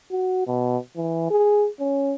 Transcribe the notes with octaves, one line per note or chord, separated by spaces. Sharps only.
F#4
B2
E3
G#4
C#4